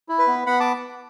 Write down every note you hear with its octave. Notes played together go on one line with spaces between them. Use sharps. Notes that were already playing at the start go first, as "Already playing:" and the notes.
E4
B4
B3
B3 F#5 B5
A5 D6